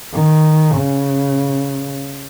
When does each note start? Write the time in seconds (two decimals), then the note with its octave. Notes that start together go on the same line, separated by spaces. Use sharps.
0.14 D#3
0.76 C#3